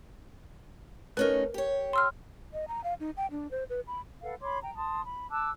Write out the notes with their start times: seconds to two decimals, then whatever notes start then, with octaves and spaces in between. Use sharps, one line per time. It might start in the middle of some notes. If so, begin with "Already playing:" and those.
1.17 A3 C#4 D#4 A#4 B4
1.54 G4 C#5
1.93 C6 E6 F6
2.53 D#5
2.68 A#5
2.84 F5
3.00 D#4
3.17 G5
3.31 D4
3.51 C5
3.70 B4
3.87 B5
4.22 A4 B4 F5 F#5
4.42 C#5 B5 C6 D6
4.61 G5 A#5
4.76 A5 C6 D#6
5.04 B5
5.30 A5 D6 E6 F#6